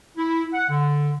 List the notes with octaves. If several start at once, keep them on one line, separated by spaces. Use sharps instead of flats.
E4
F#5
D3